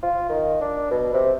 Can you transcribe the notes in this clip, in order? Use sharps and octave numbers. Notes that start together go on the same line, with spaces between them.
F4
D#3
D4
B2
C3